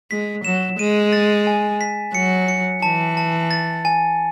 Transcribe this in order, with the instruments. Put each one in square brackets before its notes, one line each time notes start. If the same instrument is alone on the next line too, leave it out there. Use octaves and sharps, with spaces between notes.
[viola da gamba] G#3 [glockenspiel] B6
[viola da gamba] F#3 [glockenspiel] E7
[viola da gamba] G#3 [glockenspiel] D#7
[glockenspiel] A6
G#5
B6
[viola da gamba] F#3 [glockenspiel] C#7
[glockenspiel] C#7
[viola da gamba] E3 [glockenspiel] A5
[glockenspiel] A5
A6
G#5